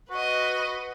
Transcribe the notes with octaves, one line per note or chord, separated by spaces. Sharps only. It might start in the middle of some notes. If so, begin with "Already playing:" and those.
F#4 B4 D#5